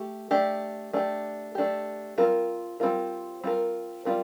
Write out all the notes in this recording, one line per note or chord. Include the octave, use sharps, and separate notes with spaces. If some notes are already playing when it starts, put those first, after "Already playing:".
Already playing: A3 G4
A3 D4 G4
A3 D4 G4
A3 D4 G4
G3 C4 F4 A#4
G3 C4 F4 A#4
G3 C4 F4 A#4
G3 C4 F4 A#4